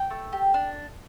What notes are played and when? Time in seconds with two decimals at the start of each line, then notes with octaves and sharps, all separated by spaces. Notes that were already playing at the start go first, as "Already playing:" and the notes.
Already playing: G5
0.10 A3
0.33 G4
0.54 D4